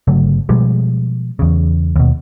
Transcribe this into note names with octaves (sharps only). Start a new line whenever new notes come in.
G1 C#3 F#3 A3
B2 F3 G3 G#3
E2 C#3
D#2 B2